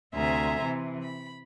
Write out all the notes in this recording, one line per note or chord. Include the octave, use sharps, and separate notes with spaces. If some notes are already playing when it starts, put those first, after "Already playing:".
D2 C3 E5 G#5 A#5 C6
C3 E3
B5